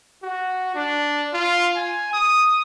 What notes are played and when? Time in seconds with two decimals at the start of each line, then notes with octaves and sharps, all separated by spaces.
0.23 F#4
0.75 D4
1.33 F4
1.76 G#5
2.13 D#6